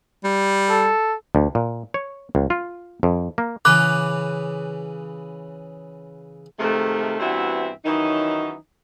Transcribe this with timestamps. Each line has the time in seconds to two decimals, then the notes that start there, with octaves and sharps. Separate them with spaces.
0.24 G3
0.69 A4
1.35 D2
1.55 A#2
1.94 C#5
2.35 C#2
2.50 F4
3.03 F2
3.38 A#3
3.65 C#3 E3 B4 D6 F#6
6.59 C3 D#3 F3 G#3 A3
7.20 G2 E3 B3 C4 F#4 E5
7.85 D#3 E3 F#3 C#4 D#4